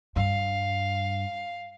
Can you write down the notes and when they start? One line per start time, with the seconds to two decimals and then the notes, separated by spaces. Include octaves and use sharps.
0.16 G2 F5